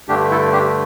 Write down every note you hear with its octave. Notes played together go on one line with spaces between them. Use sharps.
G2 D3 A3 D4 G4
E4 A4
D4 G4